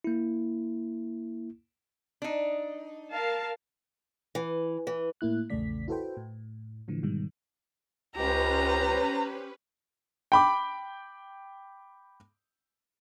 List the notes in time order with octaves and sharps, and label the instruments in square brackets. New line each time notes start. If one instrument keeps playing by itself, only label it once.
[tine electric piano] A#3 E4
[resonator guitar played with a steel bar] D4 D#4
[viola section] A#4 F5 A5
[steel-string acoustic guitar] E3
E3
[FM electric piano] A2 A#3 E4 F#6
A#1 E2 C#3 A3 D5 B6
E4 F#4 A4 B4 C5 G5
A2
A2 D3 E3 F3
G#2 B2 D#3 G3
[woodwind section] C#2 [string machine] C#4 B4 [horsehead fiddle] G4 C5 [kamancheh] A#5
[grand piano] G5 B5 D6